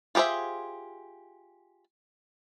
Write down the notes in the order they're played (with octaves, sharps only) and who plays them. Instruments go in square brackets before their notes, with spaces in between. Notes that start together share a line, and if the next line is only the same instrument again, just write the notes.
[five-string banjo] F4 G4 G#4 C5 E5